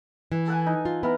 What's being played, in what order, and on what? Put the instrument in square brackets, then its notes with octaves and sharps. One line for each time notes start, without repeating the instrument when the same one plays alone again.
[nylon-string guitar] E3
[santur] A4 F#5 G#5
D#4
[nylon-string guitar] F4
[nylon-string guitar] B3 [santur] E4 A#4 A#5